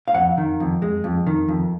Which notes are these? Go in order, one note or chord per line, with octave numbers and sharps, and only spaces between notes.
F5
F2 F#5
D#3
F2
G#3
F2
D#3
F2